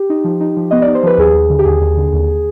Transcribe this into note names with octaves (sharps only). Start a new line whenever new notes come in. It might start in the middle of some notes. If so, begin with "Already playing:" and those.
Already playing: G4
D#4
F3
D#4
F3
B3 D#5
D5
D#4
C5
F3 B4
D#2 G#4
D#2
D3
G4
D#2 G#4
D#2
D3
D#2